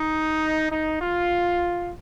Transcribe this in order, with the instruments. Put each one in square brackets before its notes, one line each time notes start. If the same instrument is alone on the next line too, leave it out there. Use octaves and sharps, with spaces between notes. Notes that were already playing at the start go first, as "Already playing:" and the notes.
Already playing: [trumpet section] D#4
D#4
F4